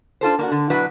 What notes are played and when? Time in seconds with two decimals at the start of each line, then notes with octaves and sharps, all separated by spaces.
0.21 D4 F4 A4 C5
0.39 A#3 D4 F#4
0.52 D3
0.70 B2 F#3 D4 E4 F#4 B4